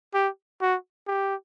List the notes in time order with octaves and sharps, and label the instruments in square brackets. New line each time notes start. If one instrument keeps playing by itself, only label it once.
[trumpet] G4
F#4
G4